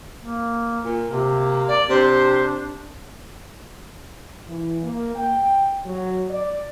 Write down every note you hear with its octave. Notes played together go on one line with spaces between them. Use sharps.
A#3
A#2
C3 A#3
D5
C3 D4 C5
E3
A#3
G5
F#3
D5